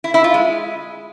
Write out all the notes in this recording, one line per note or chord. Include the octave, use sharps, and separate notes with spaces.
E4
E4
F4
G#3